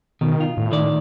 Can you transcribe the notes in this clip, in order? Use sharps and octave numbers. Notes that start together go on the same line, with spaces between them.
B2 D#3
F4
A2
D#3 D5